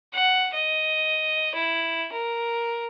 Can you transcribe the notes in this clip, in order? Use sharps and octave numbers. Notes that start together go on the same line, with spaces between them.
F#5
D#5
E4
A#4